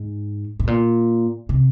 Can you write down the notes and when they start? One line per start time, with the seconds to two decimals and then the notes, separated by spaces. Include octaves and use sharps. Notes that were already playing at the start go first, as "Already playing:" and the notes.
Already playing: G#2
0.59 A2
0.67 A#2
1.49 C3